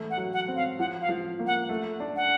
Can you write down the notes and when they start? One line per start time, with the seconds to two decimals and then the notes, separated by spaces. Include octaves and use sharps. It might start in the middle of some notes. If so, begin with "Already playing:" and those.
Already playing: E3 A3
0.10 F#5
0.17 F#3
0.33 F#5
0.48 C4
0.56 F5
0.79 F3 F#5
1.01 F5
1.09 F3
1.39 A#3
1.47 F#5
1.69 A3
2.00 D4
2.16 F#5